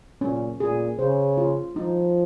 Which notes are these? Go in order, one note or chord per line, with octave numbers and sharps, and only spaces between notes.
A#2 C#4
A#2 G#4
C#3 C5
F4
F3 D#4